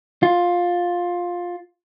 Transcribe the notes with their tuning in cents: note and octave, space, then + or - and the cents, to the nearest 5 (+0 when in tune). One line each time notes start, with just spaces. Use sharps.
F4 +15